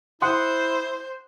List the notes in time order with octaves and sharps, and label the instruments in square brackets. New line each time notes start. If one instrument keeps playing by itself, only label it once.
[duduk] E4 [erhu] C5 [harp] F#5 C6 D#6